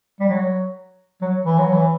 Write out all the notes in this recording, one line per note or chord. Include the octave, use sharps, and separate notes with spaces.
G3
F#3
F#3
E3
F#3
E3